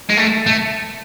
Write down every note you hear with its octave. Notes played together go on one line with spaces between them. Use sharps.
G#3
A3
A3